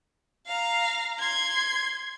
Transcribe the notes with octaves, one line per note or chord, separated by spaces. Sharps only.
F5 A#5
C6 G#6